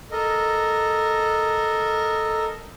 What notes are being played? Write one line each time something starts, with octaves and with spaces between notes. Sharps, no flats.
A4 A#4 D#5